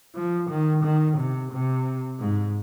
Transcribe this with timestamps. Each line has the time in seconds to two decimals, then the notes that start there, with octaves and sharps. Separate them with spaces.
0.15 F3
0.50 D#3
0.84 D#3
1.17 C3
1.51 C3
2.20 G#2